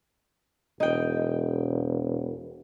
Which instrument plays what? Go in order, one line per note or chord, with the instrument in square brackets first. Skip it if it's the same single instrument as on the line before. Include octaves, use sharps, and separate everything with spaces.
[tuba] E1 [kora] D#4 G5